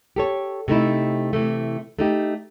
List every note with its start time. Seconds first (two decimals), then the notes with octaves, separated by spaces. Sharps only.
0.16 G4 A4 C#5
0.68 C3 A3 D#4 E4
1.33 C3 E3 A3
1.99 A3 D#4 G4